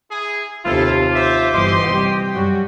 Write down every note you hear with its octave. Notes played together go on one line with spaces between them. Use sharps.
E4 G#4
D#2 C3 E4 F4 A4
C5 E5 D6
G1 E3 G4 D#5 C6
C3 G3 G5
F#2 G3 F#4